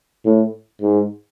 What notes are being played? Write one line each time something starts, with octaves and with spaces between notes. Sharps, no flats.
A2
G#2